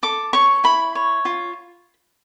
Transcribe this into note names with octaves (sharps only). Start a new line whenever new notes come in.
A4 D6
C#5 C#6
E4 B5
C#5
F4